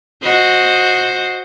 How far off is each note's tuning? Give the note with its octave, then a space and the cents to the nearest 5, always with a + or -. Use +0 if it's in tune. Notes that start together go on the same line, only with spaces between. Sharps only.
F#4 -10 C5 +0 D#5 +0